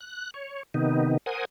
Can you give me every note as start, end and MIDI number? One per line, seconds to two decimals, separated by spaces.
0.01 0.31 90
0.34 0.63 73
0.74 1.17 48
0.74 1.17 51
0.74 1.17 59
0.74 1.17 63
1.26 1.45 70
1.26 1.45 72
1.26 1.45 78
1.26 1.45 80
1.26 1.45 87